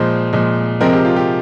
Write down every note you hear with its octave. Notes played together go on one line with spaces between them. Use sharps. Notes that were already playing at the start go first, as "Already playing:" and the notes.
Already playing: A#2 F3 G#3 C5
A#2 F3 G#3
C3 F3 G#3 C4 A#4
G4
F4
G4